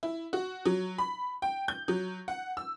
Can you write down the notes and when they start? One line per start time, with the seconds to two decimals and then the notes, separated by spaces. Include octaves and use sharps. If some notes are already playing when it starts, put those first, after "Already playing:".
0.03 E4
0.33 F#4
0.66 F#3
0.98 B5
1.42 G5
1.68 G6
1.88 F#3
2.28 F#5
2.57 E6